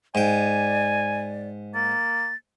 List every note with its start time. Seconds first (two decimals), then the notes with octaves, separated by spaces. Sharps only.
0.15 G#2 D5 G5 G#5
1.75 A#3 A6